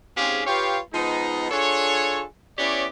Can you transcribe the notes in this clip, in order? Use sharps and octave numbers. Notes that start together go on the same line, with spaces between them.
G#2 C4 C#4 G4 G#4 F5
F4 G4 B4 C#5 F5 G5
F3 G#3 B3 D#4
D4 F4 G#4 A4 C#5
B3 C#4 E4 G4 C#5 D5